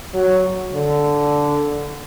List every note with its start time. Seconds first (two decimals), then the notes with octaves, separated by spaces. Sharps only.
0.14 F#3
0.74 D3